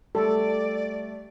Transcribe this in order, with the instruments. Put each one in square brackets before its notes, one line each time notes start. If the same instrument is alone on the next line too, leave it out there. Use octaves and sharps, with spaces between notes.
[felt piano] G3 A3 [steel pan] A4 [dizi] D5